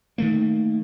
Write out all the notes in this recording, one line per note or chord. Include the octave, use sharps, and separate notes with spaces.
D#3 A3 A#3